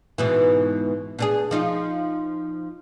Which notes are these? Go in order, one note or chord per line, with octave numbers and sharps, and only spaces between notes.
G#2 B2 E3
B2 D4 G#4
F3 D#4 F4